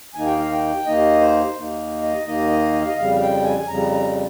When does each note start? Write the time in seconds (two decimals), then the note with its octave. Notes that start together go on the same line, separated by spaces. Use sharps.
0.15 D#2 D#3 A#3 D#4 G#5
0.26 G5
0.39 F5
0.51 G5
0.85 D#2 D#3 A#3 D#4 D#5
1.21 C5
1.56 D#2 D#3 A#3 D#4
2.03 D#5
2.26 D#2 D#3 A#3 D#4 D#5
2.51 D#5
2.73 D#5
2.81 F5
2.88 D#5
2.98 F2 C#3 G3 F5
3.15 F5
3.20 G5
3.44 G#5
3.59 G#5
3.68 F2 C#3 G3 A#5
3.91 A#5